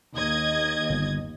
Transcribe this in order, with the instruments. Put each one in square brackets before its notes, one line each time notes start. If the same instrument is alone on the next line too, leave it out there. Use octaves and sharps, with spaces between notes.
[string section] D#2 D#5 G#6
[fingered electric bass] G1